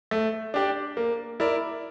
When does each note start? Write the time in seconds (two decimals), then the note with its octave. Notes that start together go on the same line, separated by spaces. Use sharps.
0.11 A3
0.54 D4 G4 D5
0.97 A#3
1.40 E4 A#4 D5